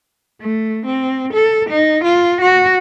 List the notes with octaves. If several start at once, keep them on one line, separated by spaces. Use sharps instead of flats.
A3
C4
A4
D#4
F4
F#4